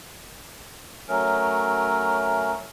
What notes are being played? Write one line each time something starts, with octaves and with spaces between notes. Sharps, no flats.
F#3 A3 C#4 A#4